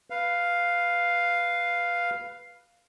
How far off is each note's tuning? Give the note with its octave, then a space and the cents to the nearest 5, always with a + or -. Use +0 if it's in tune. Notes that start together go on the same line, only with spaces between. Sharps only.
B4 +0 F5 +0